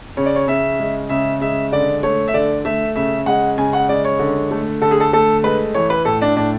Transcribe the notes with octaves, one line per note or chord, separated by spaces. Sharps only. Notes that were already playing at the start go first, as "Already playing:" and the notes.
C#3 C#5
D5
C#5
C#3 E5
G#3
C#3 E5
G#3 E5
D3 D5
A3 C#5
E5
D3 D5
A3 E5
C#3 E5
G#3 F#5
C#3 G#5
F#5
G#3 D5
C#5
D3
A3
D3 A4
G#4
A4
A3 A4
G#3 B4
E3 C#5
B4
A2 A4
D4
A2 D4